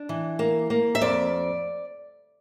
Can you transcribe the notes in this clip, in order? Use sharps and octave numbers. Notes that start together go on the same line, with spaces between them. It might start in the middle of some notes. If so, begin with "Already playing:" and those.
Already playing: D4
E3
A#3
A#3
E5
F2 D5